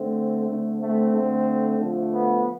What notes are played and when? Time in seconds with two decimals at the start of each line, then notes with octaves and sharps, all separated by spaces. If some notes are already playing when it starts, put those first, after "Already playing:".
Already playing: D3 A3 C4
0.45 D3 A3
0.78 A3 C4
1.12 D3
1.17 A3
1.78 D3 F3 A3
2.13 B3